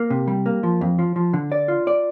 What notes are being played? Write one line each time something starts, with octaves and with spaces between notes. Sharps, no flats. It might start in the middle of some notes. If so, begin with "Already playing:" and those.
Already playing: A#3
C3
G3
A#3
F3
F2
F3
F3
D3
D5
F4
D5